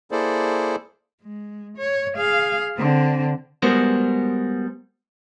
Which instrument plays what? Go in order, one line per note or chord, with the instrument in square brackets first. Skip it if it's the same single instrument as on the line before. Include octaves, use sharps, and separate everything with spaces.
[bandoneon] A#3 E4 G#4 A4 C5 D5
[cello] G#3
C#5
G#4 F5
D3 C4
[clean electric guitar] G3 G#3 B3 F#4 A#4 C5